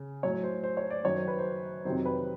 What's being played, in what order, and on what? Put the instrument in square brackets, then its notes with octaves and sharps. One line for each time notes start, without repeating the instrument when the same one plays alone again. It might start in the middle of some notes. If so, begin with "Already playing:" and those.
Already playing: [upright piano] C#3
A2 F#3 C#5
C5
C5
C#5
D5
F#2 D#3 F#3 C#5
C5
B4
C5
F2 C3 D#3 F#3 C5
B4